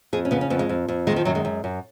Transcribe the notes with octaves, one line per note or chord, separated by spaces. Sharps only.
F2 G#4
C#4
C#3 B3
C#4
F2 B3
G#3
F2
F2
D#3 G#3
F3
F#2 F#3
G#3
F#2
F#2